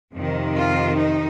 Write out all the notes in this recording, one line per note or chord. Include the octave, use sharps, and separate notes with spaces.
F2 C3 D#3
F4
D#4